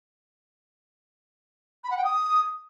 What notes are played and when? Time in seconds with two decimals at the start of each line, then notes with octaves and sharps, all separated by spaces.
1.83 B5
1.90 F#5
1.97 G5
2.04 D#6